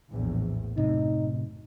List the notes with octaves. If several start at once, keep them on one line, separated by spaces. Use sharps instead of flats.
A#1 E2 A2
F#2 A2 C3 D#4